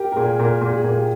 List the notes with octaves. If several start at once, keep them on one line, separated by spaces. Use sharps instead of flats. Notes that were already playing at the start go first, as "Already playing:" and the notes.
Already playing: G4 A#4
A#4
A#2 G#4
A#2 A#4
A#2 A#4
G#4
A#2
G4